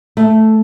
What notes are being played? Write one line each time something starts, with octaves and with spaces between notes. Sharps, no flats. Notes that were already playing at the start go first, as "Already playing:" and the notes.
A3